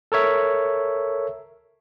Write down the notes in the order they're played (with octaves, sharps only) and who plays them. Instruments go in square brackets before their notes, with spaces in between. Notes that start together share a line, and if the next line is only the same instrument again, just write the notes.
[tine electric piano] A4 A#4 C#5 E5